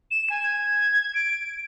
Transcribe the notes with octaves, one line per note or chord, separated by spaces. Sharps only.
E7
G#5
G#6
D7